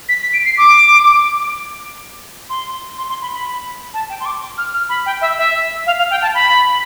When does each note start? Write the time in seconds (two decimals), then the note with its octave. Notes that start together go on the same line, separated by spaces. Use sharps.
0.09 B6
0.21 B6
0.33 D7
0.45 C7
0.58 D6
2.49 C6
2.97 C6
3.09 C6
3.22 B5
3.34 B5
3.94 A5
4.09 G5
4.20 C6
4.25 D6
4.58 F6
4.73 F6
4.89 B5
5.06 G5
5.21 E5
5.38 E5
5.86 F5
5.98 F5
6.10 G5
6.22 A5
6.34 B5